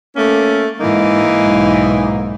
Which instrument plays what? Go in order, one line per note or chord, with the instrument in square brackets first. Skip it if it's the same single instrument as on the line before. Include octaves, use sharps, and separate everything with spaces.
[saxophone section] A3 A#3 C#4
[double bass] G#2 [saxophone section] E3 A#3 D#4
[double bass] B1 G#2